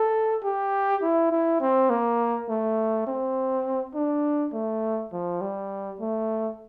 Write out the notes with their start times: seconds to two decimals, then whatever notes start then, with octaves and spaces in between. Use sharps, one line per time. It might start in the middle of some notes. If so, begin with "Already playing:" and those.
Already playing: A4
0.44 G4
1.02 E4
1.31 E4
1.61 C4
1.90 A#3
2.49 A3
3.07 C4
3.95 D4
4.53 A3
5.12 F3
5.41 G3
6.00 A3